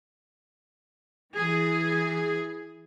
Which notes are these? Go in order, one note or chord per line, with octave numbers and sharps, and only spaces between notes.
E3 G#4